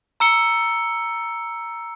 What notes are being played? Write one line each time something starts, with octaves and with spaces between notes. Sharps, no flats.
A#5 E6 C#7 G7